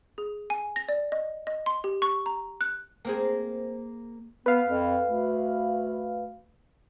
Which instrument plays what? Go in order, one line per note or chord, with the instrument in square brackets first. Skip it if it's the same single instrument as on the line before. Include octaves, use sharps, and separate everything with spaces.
[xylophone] G#4
G#5
A#6
D5
D#5
D#5
C6
G4
C#6
A#5
F#6
[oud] A#3 C4 G#4
[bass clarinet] B3 [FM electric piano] B4 F5
[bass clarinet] F2
D2